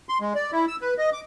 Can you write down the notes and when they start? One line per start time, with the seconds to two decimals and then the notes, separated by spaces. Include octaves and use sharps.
0.09 C6
0.21 G#3
0.35 D5
0.52 E4
0.68 E6
0.81 B4
0.98 D#5
1.13 D6